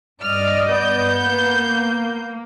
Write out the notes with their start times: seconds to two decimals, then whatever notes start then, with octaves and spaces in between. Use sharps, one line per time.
0.22 G2 D5 D#5 F6
0.70 B3 G6
1.23 A#3